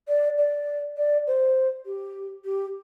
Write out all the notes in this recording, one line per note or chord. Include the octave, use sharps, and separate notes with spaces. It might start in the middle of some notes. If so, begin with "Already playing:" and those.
D5
D5
D5
C5
G4
G4